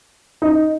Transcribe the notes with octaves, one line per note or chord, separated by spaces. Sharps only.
D#4